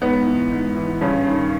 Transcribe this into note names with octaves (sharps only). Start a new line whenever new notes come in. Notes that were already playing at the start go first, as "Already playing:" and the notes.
G#2 B3
E3
G#2
E3
G2 C#3 C#4
D#3